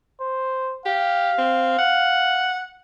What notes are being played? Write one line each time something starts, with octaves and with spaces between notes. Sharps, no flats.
C5
G4 F5
C4
F#5